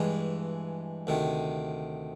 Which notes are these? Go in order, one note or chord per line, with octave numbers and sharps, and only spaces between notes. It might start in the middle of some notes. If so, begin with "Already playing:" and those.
Already playing: G2 E3 G#3
D2 C3 D#3